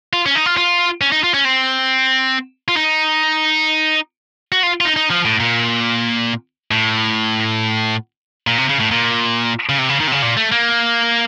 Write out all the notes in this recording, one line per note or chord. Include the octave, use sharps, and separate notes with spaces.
F4
C#4
D#4
F4
F4
C#4
D#4
F4
C#4
C4
F4
D#4
F#4
F4
F4
D#4
D#4
F3
A2
A#2
A2
A#2
C3
C#3
A2
A#2
C#3
C3
C#3
D#3
C3
C#3
A#2
A3
A#3